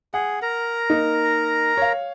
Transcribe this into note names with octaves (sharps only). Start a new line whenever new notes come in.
G#4 F#5
A#4 A#5
A#3 D#4
C#5 F5